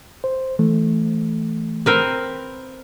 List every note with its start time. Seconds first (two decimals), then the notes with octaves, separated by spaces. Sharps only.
0.24 C5
0.59 E3 A3
1.86 C4 A#4 B4